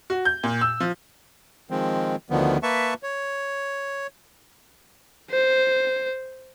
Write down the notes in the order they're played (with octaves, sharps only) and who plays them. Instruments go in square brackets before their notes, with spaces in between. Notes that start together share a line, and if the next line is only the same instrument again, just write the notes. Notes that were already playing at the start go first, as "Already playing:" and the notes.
[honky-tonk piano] F#4
G6
A#2
E6
F3
[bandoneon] D#3 F3 G#3 C4
D2 D3 D#3 F3 B3
A#3 B4 E5 A5 C#6
C#5
[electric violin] C5